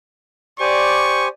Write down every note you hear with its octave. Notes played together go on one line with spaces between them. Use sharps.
G4 C5 D5 G#5 C#6